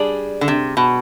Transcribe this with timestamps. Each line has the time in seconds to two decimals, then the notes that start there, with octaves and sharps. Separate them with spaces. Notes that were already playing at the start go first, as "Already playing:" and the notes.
Already playing: G3 D4 G#4 D5
0.41 D3
0.48 C3
0.77 B2